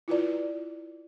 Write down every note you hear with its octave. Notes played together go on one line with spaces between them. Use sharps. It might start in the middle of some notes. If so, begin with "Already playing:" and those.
E4 F4 B4 D5